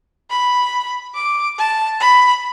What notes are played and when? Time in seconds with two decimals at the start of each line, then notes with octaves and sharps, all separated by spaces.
0.30 B5
1.16 D6
1.58 A5
2.00 B5